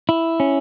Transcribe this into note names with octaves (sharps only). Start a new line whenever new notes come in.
E4
C#4